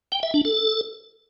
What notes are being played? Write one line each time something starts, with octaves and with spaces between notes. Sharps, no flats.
G5
E5
D4
A4